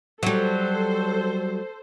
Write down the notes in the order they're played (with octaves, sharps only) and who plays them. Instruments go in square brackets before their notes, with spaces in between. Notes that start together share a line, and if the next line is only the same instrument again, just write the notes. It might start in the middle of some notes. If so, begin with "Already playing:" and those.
[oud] F#3 G3 [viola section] A4 C5